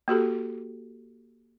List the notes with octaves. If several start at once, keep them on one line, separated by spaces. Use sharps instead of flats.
A#3 F#4 G4 A4